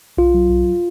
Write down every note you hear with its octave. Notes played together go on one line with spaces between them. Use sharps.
B1 F4
F#3
B1